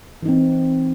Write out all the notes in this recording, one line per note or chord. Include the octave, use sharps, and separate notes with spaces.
E3 C4 D#4